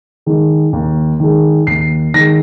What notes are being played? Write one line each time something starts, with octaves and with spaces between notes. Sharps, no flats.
D#3 G#3
D#2
D#3 G#3
D#2 C7
D#3 G#3 A#6